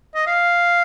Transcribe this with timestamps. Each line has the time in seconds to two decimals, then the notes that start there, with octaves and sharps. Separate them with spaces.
0.15 D#5
0.27 F5